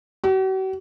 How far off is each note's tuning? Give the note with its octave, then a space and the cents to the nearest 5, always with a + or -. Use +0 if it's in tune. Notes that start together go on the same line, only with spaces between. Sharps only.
F#4 +45